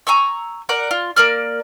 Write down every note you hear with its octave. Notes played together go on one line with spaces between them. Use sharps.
G#5 A#5 C#6 E6
A#4 D5 F#5
F4
A#3 A#4 D5 F6